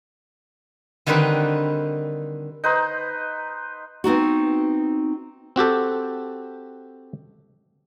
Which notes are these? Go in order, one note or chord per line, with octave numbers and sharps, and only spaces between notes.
D3 D#3 G3 C4 D#4 B4
D#4 B4 C5
B3 C4 D#4 F#4
C4 F#4 G4 A4